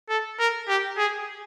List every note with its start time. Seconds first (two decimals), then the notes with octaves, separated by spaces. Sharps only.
0.09 A4
0.39 A#4
0.68 G4
0.97 G#4